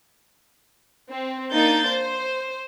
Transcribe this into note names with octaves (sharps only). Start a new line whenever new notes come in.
C4
A#3 D4 D#4 G6 A6
C5